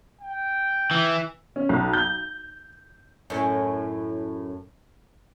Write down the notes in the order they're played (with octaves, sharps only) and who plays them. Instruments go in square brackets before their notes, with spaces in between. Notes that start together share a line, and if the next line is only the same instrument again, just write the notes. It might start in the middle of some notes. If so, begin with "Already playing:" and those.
[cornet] G5
[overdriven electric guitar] E3
[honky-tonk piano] C#4
B1
G6
[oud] F#2 A2 C#4